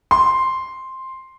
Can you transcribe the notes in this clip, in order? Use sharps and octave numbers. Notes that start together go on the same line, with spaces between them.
C6